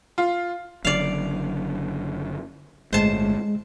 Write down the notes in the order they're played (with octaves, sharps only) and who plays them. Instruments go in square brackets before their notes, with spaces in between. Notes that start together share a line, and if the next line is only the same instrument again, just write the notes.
[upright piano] F4
[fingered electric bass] F#1 F#2 D3 [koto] D5 F5
[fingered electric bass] G1 A2 A3 [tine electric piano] G#3 [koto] C5 A5